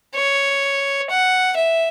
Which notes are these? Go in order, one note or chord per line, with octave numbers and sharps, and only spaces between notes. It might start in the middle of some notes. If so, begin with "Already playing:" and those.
C#5
F#5
E5